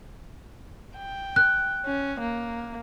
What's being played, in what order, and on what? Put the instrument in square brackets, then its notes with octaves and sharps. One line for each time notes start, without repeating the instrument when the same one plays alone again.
[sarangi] G5
[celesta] F#6
[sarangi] C#4
A#3